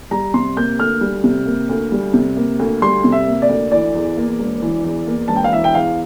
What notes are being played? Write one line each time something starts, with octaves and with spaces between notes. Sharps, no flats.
G3 A#5
C3 C6
A#3 G6
D2 F6
G3
C3
A#3
D2
G3
C3
A#3
D2
G3 C6
C3
E5
A#3
D5
D2
E3 D5
E2
A#3
E1
E3
E2
A#3
E1 A5
G5
F5
E3 E5
G5
E2 F5